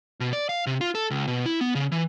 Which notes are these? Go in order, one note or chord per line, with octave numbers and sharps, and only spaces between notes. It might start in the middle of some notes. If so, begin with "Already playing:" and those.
B2
D5
F5
C3
F4
A4
C#2
B2
E4
B3
C#3
E3